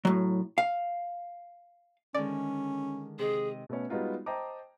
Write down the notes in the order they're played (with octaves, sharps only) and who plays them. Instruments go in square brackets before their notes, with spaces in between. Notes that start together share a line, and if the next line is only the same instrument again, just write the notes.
[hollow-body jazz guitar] A2 F#3
F5
[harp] D3 D#3 G#3 [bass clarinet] C#4 [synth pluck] D5
[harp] C3 D#5 D#6 [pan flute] G#4
[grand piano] B2 A3 B3 C#4
G3 G#3 B3 D#4 F4 F#4
C5 D#5 G5 A5 A#5 D6